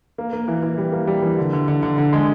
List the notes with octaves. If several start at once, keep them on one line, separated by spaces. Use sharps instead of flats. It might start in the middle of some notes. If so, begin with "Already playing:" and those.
A#3
A#3
E3
E3
G3
A#3
G3
E3
D3
D3
D3
D3
D3
G#3